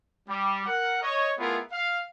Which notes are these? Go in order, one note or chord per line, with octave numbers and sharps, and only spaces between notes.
G3
A#4 F#5
C#5 D#5
A3 B3 E4 F4 G#4 A#4
F5